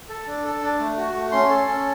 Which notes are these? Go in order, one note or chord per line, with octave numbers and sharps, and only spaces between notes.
A4
D4
A4
D4
A3
F#4
A3
C#4 C6
A4
C#4